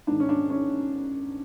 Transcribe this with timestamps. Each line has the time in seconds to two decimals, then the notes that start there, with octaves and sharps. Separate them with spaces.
0.07 G#2 D#3 D4
0.20 C#4
0.29 D4
0.50 C#4